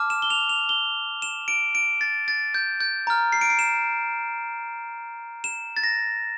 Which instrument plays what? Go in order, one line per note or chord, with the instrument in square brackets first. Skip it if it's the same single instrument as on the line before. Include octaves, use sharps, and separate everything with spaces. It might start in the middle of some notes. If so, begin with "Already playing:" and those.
Already playing: [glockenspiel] A5 D6 F6
E7
G7
F7
F7
G7
E7
D7
D7
A6
A6
G6
G6
A#5 F6
C7
D7
C7
E7
E7
A6
A#6